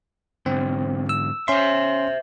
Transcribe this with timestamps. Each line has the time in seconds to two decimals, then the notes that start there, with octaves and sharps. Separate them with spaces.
0.46 G#2 D3 C4
1.09 E6
1.48 C#4 C5 E5 C6